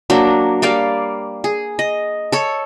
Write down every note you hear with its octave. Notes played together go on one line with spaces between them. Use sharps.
F#3 A#3 D4
G3 A#3 D5 F5
G#4
D#5
A4 C#5